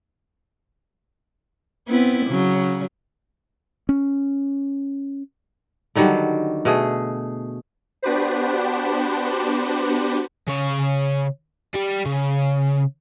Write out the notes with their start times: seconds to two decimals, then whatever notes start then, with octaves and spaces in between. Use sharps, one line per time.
1.89 B3 C4 E4
2.26 C#3 F#3
3.89 C#4
5.95 D3 D#3 F#3 G3
6.65 B2 A3 G#4
8.03 B3 D4 F#4 G4 B4 C5
10.47 C#3 C#5
11.74 G3 G4
12.05 C#3